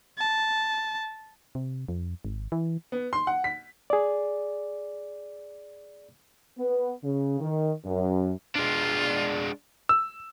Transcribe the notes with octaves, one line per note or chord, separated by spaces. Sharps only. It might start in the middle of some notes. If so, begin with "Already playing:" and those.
A5
C3
F2
G#1
E3
B3
C6
F#5
B6
G#4 D5
B3
C#3
D#3
F#2
G#3 D4 F4
E6